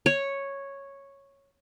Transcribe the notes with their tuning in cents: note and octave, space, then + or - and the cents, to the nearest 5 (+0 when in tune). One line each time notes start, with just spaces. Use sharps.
C#5 -5